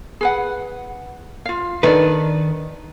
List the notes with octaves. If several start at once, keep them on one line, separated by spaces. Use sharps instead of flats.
G#4 B4 F#5
F4 F5
D#3 D4 A4 B4 D5